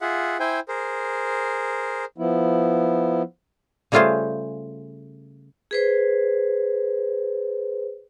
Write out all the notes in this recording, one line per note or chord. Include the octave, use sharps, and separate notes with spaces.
F4 G#4 E5 F#5
E4 C5 G5 G#5
G#4 A#4 C5
F3 B3 E4
C#3 G3 A3 F4 G#4 C5
G#4 B4 C5